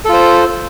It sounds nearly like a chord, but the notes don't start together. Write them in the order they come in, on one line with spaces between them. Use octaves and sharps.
A4 F4 C5